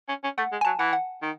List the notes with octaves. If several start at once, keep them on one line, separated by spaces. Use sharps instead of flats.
C#4
C#4
A3 F#5
G#3
G#5
F#3 A5
E3 F#5
F#5
D#3